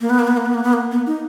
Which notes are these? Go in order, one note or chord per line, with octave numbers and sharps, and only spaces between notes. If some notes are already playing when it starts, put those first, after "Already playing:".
A#3
B3
A#3
B3
A#3
B3
A#3
B3
A#3
B3
D#4